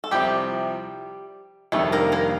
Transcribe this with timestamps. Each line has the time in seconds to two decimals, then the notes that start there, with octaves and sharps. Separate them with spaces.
0.04 A4
0.11 C2 C3 F3 G3 C4 G4
1.72 F2 C3 D#3 G3 A3 D4 A4
1.92 A#3 A#4
2.12 A#3 A#4